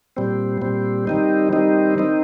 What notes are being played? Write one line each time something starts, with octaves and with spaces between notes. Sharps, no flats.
A#2 G3 C4
A#2 G3 C4
D#3 G3 C4 D#4
D#3 G3 C4 D#4
D#3 C4 D#4